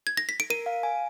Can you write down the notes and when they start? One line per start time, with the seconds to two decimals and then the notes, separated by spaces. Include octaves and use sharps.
0.07 G#6
0.17 A#6
0.29 B6
0.40 D7
0.50 A#4 D#7
0.66 F5
0.83 G#5